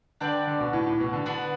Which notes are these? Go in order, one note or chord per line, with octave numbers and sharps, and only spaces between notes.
D3 D4 B4 D5 G5
D3
B2
A2
A2
B2
D3
D3 B3 D4 B4